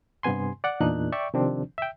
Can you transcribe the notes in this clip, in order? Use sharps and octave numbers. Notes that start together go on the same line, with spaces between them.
G2 C3 B3 G#5 C6
D5 F#5
E2 A#2 D4 D#4 F#6
D5 E5 G5 C#6
C3 D#3 F3 C4 D4
E5 G5